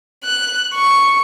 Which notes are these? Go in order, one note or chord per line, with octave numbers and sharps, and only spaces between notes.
F#6
C#6